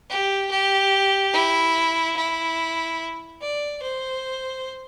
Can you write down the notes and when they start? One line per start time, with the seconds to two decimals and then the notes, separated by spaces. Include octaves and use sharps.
0.10 G4
0.52 G4
1.33 E4
2.17 E4
3.42 D5
3.82 C5